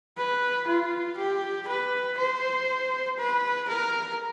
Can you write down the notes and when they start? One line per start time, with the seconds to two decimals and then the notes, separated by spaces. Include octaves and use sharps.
0.18 B4
0.68 F4
1.18 G4
1.68 B4
2.18 C5
3.18 B4
3.69 A#4